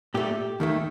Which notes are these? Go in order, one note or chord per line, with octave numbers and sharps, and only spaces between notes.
A#2 A3 G4
D#2 D#3 A3